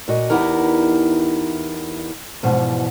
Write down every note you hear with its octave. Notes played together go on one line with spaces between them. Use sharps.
A#2 F#4 D#5
E2 B3 D#4 E4 G4 A#4
E2 G#2 B2 F3